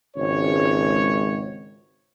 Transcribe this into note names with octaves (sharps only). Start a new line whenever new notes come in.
G#1 C#2 C#5